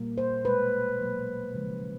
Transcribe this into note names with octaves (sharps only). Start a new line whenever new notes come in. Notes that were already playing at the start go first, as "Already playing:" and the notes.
Already playing: A#2 G3 A#3
C5
B2 G#3 B4
B2 F#3 A#3
C#3 F3 G#3